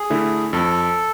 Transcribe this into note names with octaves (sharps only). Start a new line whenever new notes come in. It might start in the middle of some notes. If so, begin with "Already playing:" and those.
Already playing: G#4
D3 A3 E4
F2 A4